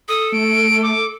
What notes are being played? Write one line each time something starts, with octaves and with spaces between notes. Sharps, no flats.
A4 D#6
A3 D7
D6